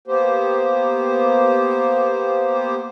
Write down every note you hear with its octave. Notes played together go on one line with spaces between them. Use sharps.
A#3 B3 G4 C5